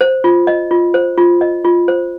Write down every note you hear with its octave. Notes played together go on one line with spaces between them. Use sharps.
C5
F4
D#5
F4
C5
F4
D#5
F4
C5